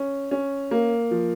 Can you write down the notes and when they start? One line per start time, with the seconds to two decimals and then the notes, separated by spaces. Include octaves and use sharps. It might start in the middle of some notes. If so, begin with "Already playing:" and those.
Already playing: C#4
0.31 C#4
0.71 A#3
1.11 F3